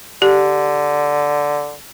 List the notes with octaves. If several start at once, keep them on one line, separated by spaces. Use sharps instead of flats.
D3 G4